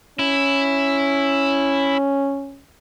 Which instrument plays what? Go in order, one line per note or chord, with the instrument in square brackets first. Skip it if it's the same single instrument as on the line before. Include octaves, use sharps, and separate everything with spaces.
[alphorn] C#4 [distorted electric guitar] E4